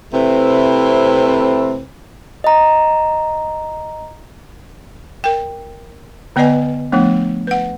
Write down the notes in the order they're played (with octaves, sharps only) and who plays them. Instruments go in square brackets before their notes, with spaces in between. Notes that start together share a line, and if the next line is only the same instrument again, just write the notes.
[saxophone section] C3 A3 C4 E4 B4
[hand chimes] D#5 A#5
[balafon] A#4 G5
D3 B3 B4 D5 D#5 G#5
F3 A3 B3 D4
B4 F#5